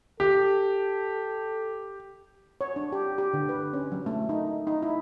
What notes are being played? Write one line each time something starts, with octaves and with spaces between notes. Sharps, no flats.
G4 A4
C#5
D4
G4
G4
D3
B4
C#4
F#3
A3
D#4
D#4
E4